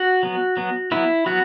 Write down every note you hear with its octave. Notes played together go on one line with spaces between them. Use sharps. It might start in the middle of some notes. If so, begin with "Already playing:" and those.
Already playing: F#4
F#3 B3
F#3 B3
F#3 B3 E4
F#3 B3 F#4